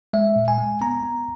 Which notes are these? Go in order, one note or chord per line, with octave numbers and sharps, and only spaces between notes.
G#3 E5
A#2
G#5
G#3
B3 A#5
B3